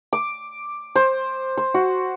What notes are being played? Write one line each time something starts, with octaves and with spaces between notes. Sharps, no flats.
D6
C5
C5
F#4